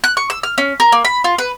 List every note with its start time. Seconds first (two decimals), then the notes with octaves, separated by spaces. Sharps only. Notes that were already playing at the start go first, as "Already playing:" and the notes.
0.04 F#6
0.17 C#6
0.30 E6
0.43 F6
0.58 C#4
0.80 A#4
0.92 A#3
1.05 B5
1.24 F4
1.38 B4